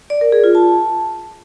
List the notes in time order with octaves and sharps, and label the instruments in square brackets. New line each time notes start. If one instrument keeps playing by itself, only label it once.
[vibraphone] D5
A#4
G#4
F4
A5